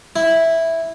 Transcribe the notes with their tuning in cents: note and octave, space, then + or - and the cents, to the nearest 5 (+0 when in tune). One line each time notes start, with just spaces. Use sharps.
E4 -5